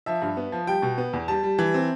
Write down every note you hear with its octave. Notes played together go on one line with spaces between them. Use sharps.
F3 E5
G2
B3
F3
G3 G5
B2
B3
E2
G3 A5
G3
E3
C4